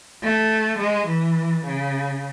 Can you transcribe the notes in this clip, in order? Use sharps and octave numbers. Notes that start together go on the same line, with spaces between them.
A3
G#3
E3
C#3